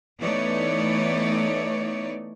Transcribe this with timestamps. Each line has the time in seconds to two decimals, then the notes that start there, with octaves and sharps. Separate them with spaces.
0.19 E3 A3 B3 D#4 C#5 D5